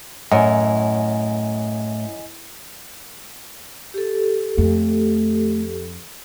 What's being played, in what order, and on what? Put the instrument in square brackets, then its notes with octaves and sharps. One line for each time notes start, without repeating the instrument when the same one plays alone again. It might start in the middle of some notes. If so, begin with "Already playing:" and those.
[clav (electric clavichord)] F#2 [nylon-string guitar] A2 [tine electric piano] D#5 G#5
[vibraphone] G4 A4
[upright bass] F2 [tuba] A3